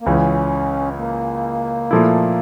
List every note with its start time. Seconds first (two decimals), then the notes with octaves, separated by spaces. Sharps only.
0.01 A#3
0.06 C#2 C#3 E3 C#4
0.98 A#3
1.91 A#2 F3 A3 E4